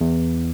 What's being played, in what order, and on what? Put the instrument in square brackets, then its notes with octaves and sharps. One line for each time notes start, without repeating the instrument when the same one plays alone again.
[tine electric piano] E2